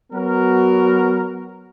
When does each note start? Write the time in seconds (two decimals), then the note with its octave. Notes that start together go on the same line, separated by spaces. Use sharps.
0.12 F#3 B3 F#4 A#4